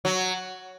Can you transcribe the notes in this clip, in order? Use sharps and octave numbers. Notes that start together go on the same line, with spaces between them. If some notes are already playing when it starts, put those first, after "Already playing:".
F#3